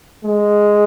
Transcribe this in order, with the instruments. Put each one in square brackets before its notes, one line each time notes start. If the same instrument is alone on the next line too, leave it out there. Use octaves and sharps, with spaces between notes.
[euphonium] G#3